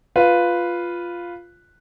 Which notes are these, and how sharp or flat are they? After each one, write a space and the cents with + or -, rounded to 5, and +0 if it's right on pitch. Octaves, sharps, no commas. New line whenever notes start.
F4 +0 B4 +0